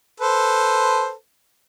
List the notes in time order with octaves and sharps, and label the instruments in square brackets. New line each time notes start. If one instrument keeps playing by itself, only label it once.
[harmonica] A4 B4 C5